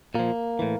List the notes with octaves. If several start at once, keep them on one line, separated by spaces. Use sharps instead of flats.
A#2 F3 A#3
A2 E3